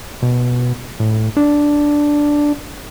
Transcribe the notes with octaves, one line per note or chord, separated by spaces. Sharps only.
B2
A2
D4